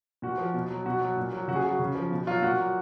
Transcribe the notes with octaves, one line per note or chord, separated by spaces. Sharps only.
A#2 F#4
F3
B2
F#3
B2 F#4
F#3
A#2
F#3
C#3 F#4
G#4
F#3 F#4
C#3
F3
B2
F#3 F4
A#2 F#4
F#3